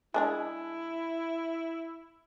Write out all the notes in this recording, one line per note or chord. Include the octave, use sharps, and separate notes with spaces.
G#3 D4 E4 G#4